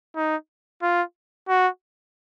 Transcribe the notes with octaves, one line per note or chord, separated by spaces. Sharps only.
D#4
F4
F#4